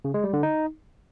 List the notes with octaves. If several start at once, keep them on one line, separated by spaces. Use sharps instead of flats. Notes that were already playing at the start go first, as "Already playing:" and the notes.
C#3
G#3
G3
D3
D#4